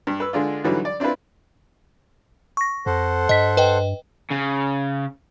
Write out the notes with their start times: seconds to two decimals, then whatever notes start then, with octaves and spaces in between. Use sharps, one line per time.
0.07 G2
0.20 B4 E6
0.33 D3 G#3 D4 F4
0.64 G#2 D3 E3 F#3 G3
0.85 D5
1.00 C4 D4 E4 F4 B4
2.57 C#6 A#6
2.86 F2 A4 C5 F#5
3.29 G2 D#5 B6
3.57 B4 D#5 G5
4.31 C#3